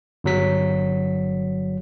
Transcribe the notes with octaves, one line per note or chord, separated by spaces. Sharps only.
G1 F#3 B6